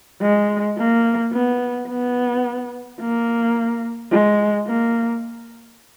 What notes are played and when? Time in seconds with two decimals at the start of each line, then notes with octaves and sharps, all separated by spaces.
0.22 G#3
0.78 A#3
1.33 B3
1.89 B3
3.01 A#3
4.12 G#3
4.68 A#3